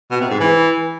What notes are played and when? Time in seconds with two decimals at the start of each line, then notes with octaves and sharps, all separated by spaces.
0.11 B2
0.21 C3
0.30 G#2
0.40 E3